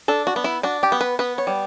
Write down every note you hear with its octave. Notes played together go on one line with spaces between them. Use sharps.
D4 A4
F#4
B3
E4
D4 F#4
G4
B3
B4
B3 B4
C#5
G3